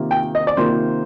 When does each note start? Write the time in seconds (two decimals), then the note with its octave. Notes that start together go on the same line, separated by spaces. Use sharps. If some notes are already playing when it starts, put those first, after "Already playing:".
Already playing: C3 D#3 A#3 F4
0.11 G5
0.35 D#5
0.47 D5
0.57 C3 D#3 A#3 F4 C5